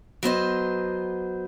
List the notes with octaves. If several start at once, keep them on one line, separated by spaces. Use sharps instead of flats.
F#3 B3 C5 D#5